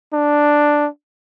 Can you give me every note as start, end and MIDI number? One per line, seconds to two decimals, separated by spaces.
0.13 0.88 62